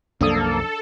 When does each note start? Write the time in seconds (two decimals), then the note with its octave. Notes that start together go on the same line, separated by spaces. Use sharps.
0.21 C2 F#2 F3 A#3 D4 A4 D#6